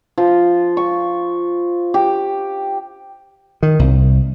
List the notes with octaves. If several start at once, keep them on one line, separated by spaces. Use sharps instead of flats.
F3
C#6
G4
D#3
C2